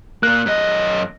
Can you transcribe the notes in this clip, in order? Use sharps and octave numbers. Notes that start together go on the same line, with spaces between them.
A#2 A#3 F#6
F#2 D#5